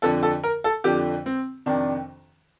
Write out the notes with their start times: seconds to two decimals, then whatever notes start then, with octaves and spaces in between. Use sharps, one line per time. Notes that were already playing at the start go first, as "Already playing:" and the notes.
0.02 F2 D3 F3 A4
0.23 A4
0.44 A#4
0.64 A4
0.84 F2 D3 F3 G4
1.26 C4
1.66 F2 C3 D#3 D4